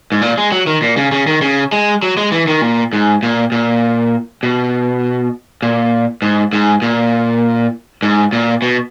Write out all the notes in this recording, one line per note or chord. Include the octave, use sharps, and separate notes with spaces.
G#2
A#2
G#3
F#3
D#3
A#2
C#3
C#3
D#3
C#3
G#3
F#3
G#3
E3
D#3
A#2
G#2
A#2
A#2
B2
A#2
G#2
G#2
A#2
G#2
A#2
B2